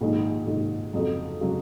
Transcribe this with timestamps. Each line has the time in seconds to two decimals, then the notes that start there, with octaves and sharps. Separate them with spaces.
0.01 A#1 G#2 D#3
0.47 A#1 G#2 D#3
0.93 F2 C#3 F#3
1.41 C#3 F#3